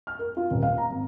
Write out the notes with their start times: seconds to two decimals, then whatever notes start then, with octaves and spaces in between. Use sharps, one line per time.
0.07 F6
0.19 A#4
0.37 F4
0.51 D#1
0.63 F5
0.77 A#5
0.90 G#1